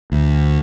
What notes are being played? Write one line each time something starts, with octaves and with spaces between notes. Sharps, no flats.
D2